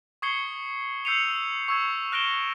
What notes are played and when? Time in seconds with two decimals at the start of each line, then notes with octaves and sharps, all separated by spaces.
0.22 C#6 D#6 G#6 C7 C#7 G7
1.05 E6 G6 C7 C#7 D#7 F7
1.68 C#6 E6 G#6
2.12 F6 F#6 A#6 D7 E7 G7